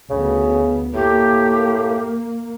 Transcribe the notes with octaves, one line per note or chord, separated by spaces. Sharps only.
D2 C#3 B3
A2 A#3 G4